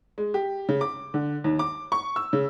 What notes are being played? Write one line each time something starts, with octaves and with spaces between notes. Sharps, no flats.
G#3
G4
C#3
D6
D3
D#2
D6
C#6
E6
C#3